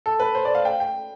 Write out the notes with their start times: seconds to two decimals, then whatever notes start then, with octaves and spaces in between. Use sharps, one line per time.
0.06 A4
0.20 B4
0.35 C5
0.45 D5
0.55 F5
0.65 G5
0.80 G5